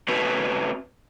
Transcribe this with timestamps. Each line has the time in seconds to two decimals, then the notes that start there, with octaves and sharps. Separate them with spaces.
0.08 A3 C4 C#4 F#4 B4